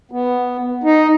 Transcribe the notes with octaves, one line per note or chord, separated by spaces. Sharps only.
B3
D#4